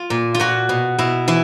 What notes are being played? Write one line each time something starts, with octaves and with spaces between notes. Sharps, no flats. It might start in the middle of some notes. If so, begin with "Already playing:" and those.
Already playing: F4
A#2
F4
A#2 F#4
B2
B2 E4
E3 E4